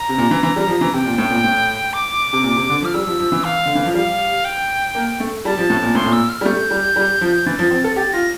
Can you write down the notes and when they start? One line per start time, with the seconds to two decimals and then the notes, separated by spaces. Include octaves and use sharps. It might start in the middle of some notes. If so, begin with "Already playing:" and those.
Already playing: A#5
0.09 C3
0.18 A#2
0.31 E3
0.43 E3
0.56 G3
0.68 F3
0.81 E3
0.94 C3 G5
1.06 A#2
1.18 A2
1.31 A#2
1.44 A2
1.93 D6
2.33 C3
2.44 A#2
2.56 C3
2.70 D3
2.82 F3
2.85 F6
2.94 G3 E6
3.07 F3
3.19 F3
3.32 E3
3.44 F5
3.66 D3
3.75 E3
3.85 F3
3.94 G3 F5
4.45 G5
4.95 A#3
5.20 A3
5.45 G3 A5
5.58 F3
5.70 A2
5.83 A#2
5.95 A2 C6
6.06 A#2
6.13 E6
6.29 F6
6.41 G3
6.45 A3 G6
6.71 G3
6.96 G3
7.21 F3
7.46 E3 A6
7.59 F3
7.71 C4
7.84 A4
7.96 G4 A6
8.13 F4 A#6